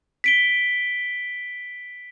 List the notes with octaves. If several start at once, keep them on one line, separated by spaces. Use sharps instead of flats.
B6 D7 G7